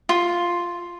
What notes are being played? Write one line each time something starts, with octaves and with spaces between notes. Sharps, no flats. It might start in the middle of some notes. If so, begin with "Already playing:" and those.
F4